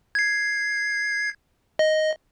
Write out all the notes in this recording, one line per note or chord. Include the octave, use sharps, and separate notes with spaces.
G#6 C7
D#5